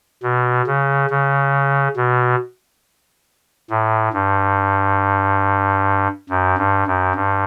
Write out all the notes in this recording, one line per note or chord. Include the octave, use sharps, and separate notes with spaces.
B2
C#3
C#3
B2
A2
G2
F#2
G2
F#2
G2